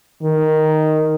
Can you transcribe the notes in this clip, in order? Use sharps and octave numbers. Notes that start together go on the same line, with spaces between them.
D#3